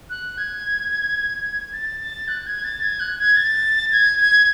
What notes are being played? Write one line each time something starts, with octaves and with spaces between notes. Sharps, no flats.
F#6
G#6
A6
A6
F#6
G#6
A6
G#6
F#6
G#6
A6
G#6
G#6